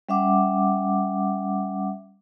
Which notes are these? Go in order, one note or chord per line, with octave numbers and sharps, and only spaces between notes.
G3 C#4 E5 F#5 D6